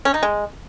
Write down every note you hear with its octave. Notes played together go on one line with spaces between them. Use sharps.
C#4
D#4
G#3